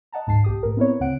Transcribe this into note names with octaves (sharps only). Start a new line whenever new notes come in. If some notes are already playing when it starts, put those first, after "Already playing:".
D#5 F#5 A5 A#5
D2 G#2 A5 C7
B1 G4 D#6
A2 A#4
B3 C4 E4 A#4 B4 C#5
D2 C#3 C4 F#5 D7